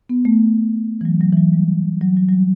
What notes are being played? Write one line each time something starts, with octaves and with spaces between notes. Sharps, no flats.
B3
A3
E3
F#3
F#3
E3
F#3
G3
F#3
F#3
F#3
G3